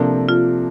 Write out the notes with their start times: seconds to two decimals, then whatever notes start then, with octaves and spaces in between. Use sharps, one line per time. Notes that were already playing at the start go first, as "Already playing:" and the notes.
Already playing: C3 F3 A#3 D4 A4
0.29 F4